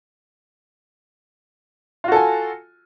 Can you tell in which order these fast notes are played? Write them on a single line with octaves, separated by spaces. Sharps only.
F4 F#4 A4 G#5